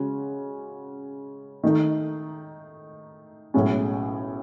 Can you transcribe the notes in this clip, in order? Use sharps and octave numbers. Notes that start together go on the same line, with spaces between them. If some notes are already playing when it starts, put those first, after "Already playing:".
Already playing: C#3 G#3 C#4 F#4
D#3 A3 D#4
B1 A2 G#3 C#4